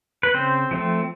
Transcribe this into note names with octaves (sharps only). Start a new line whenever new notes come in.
B4
C#3 C4 C5
F3 A3 C4